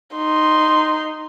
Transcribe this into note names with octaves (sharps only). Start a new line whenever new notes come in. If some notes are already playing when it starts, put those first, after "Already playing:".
D#4 C6